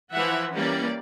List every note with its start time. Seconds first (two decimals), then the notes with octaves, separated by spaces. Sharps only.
0.13 E3 F3 E5 F#5
0.55 E3 G3 A#3 C#4 D5